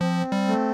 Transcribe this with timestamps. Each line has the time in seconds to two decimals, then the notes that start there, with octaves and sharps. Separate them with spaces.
0.01 F3 C4
0.32 G3
0.48 A3